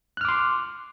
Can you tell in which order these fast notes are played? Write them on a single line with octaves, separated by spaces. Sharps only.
F#6 F6 D6 C6